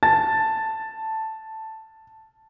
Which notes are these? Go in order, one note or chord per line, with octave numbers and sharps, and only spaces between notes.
A5 A6